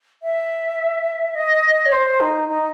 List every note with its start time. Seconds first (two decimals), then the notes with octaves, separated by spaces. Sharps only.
0.22 E5
1.35 D#5
1.86 C#5
1.92 C5
2.20 D#4
2.48 D#4